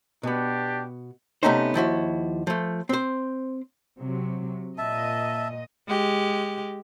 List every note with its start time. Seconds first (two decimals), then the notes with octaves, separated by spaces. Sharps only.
0.23 B2 B3 D4 G4
1.43 C3 A3 B3 C#4 D#4 C5
1.74 D#2 F3 E4 F#4
2.47 F3 A3
2.89 C4 C5
4.00 C3 F#3
4.78 A#2 D#5 E5 A5
5.88 G#3 G4